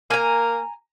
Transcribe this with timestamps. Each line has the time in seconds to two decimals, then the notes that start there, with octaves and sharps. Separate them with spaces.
0.10 A#3 G#5 A#5